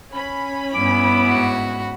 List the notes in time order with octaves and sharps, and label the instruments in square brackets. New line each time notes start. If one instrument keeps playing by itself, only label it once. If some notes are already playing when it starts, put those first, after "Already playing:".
[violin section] C#4 B5
[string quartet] G2 [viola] B3 E4 [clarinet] D6
[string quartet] G#2 F#4